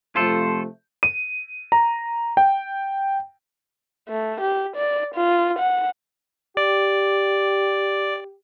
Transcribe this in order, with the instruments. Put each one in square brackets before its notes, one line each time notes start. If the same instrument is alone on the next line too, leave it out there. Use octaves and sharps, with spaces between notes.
[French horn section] C3 F3 A3 [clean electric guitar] F4 A4 [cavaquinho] C5
[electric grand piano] D#7
A#5
G5
[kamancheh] A3
G4
D5
F4
F#5
[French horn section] G4 [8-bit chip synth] D5